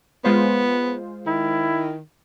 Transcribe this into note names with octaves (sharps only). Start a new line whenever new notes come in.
G#3 B3 F4 C5
D#3 E4